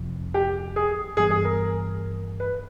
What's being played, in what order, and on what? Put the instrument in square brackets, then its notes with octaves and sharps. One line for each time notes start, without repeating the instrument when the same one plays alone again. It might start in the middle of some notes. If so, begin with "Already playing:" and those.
Already playing: [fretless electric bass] F1 F2 C3 F3
[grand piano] G4
G#4
[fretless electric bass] G2 E3 G3 B3 [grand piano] G#4
[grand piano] G#4
A#4
B4